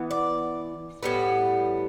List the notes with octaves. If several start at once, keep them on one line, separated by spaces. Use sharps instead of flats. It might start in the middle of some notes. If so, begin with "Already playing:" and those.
Already playing: E3 B3
D5
A2 G3 B3